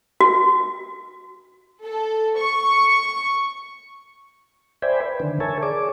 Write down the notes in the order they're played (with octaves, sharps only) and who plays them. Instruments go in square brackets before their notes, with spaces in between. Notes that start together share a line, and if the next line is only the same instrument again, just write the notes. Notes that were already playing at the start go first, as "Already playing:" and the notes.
[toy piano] F#4
[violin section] A4
C#6
[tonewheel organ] C5 D5 E5 G5 G#5 B5
B4
D3 D#3
A#4 C#5 E5 G#5 A5
G#4 C#5 D5 D6